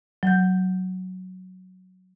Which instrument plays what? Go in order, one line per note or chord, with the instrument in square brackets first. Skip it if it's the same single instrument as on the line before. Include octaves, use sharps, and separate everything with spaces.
[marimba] F#3 G6